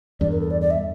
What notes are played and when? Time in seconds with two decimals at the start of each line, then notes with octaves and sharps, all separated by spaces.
0.20 E2 G2 D5
0.31 A#4
0.40 A4
0.51 D5
0.61 D5
0.71 E5